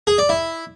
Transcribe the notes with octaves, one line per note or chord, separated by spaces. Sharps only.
G#4
D5
E4